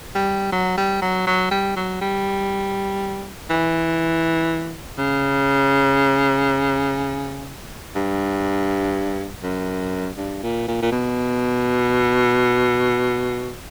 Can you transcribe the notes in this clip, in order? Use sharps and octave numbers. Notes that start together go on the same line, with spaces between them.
G3
F#3
G3
F#3
F#3
G3
F#3
G3
E3
C#3
G2
F#2
G2
A#2
A#2
A#2
B2